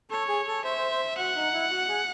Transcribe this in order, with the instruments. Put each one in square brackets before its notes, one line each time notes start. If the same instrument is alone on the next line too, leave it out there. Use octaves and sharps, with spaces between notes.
[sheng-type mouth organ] A4 [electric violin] C#5
[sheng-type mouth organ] G#4
A4
[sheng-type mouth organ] C5 [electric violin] E5
[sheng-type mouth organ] C5
C5
[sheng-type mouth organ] F#4 [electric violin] F#5
[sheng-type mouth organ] D#4
E4
F#4
G#4